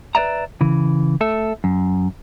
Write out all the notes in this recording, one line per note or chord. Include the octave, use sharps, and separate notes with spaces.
B4 C5 D5 E5 A#5
C#3 E3
A3 A4 E5
F#2